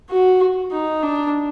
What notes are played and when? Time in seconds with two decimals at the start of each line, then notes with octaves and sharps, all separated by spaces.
0.10 F#4
0.72 D#4
1.02 D4